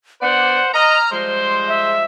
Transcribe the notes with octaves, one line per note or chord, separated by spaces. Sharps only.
B3 D4 C5 D5 F#5
D#5 A#5 F6
F3 G3 G#3 C5 C6
E5